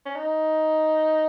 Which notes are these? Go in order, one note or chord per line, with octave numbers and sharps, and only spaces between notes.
C#4
D#4